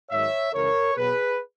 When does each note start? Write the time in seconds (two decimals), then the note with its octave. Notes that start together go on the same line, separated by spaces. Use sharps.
0.10 G#2 D#3 F#3 C#5 E5
0.52 C#2 C#3 E3 A#4 C#5
0.95 B2 F#3 B3 G#4 B4